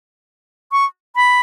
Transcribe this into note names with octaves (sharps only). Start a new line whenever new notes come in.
C#6
B5